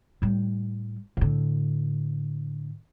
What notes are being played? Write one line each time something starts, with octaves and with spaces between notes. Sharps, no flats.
A2 G3
A2 D3